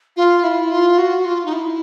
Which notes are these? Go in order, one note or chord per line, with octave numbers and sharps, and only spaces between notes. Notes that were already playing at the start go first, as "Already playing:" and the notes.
F4
E4
F4
F#4
F4
D#4
E4